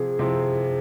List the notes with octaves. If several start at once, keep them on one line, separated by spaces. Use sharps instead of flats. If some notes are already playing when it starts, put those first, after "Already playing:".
Already playing: C3 F3 C4 G#4
C3 F3 C4